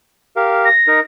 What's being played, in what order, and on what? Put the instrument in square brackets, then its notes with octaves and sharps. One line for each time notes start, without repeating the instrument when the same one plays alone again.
[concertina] G4 A#4 F5
[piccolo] A#6
[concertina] D#4 A#4